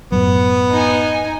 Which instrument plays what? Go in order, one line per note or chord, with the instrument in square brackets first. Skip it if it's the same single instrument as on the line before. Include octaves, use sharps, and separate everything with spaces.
[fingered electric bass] F#2 A2 F#3 [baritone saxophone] B3
[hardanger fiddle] D#4 G#5